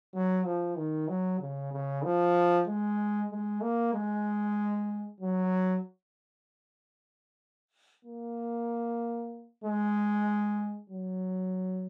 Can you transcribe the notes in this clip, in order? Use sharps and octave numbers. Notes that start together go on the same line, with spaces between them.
F#3
F3
D#3
F#3
C#3
C#3
F3
G#3
G#3
A#3
G#3
F#3
A#3
G#3
F#3